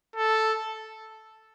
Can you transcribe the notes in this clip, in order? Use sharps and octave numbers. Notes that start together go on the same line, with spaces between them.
A4